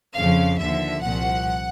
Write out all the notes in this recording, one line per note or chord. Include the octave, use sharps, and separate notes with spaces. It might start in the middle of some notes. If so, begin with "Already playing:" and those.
F2 C#3 F3 F5
D#2 D3 F3 E5
C2 A#2 F3 F#5